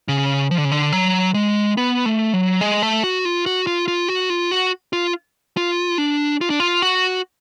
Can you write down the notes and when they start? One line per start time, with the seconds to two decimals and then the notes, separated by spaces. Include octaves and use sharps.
0.08 C#3
0.51 F3
0.58 D3
0.65 C#3
0.71 D3
0.92 F#3
1.34 G#3
1.77 B3
2.05 A3
2.33 F#3
2.61 G#3
2.83 A3
3.04 F#4
3.25 F4
3.46 F#4
3.67 F4
3.88 F4
4.08 F#4
4.30 F4
4.51 F#4
4.93 F4
5.57 F4
5.98 D4
6.41 F4
6.50 D4
6.60 F4
6.82 F#4